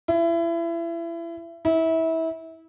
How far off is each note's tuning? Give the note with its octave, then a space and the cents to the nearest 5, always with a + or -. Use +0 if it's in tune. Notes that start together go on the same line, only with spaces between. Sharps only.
E4 +30
E4 -25